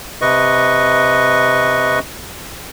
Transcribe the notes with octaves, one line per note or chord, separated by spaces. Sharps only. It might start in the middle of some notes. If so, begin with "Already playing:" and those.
C3 B4 D#5 C#6